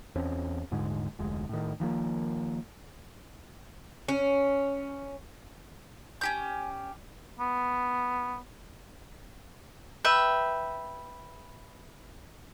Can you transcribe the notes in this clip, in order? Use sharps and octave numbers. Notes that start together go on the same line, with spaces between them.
E2 C4 C#4
D#1 G#2 D3 G#3
F1 D2 G#3
A2 D#3
D#3 F3 G3 A#3
C#4
C#4 G4 G#5 G6
B3
B4 E5 G5